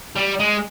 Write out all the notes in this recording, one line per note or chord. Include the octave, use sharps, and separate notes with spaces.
G3
G#3